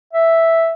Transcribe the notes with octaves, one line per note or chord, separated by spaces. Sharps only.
E5